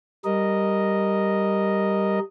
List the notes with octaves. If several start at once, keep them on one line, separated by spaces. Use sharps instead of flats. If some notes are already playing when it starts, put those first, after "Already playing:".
G3 A#4 D#5